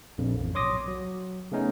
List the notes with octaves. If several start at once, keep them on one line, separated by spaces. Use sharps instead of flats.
A#1 F2
A1
B1 C#5 C6 D6 D#6 A#6
F#3
C#3 A3 B3 C#4 D#4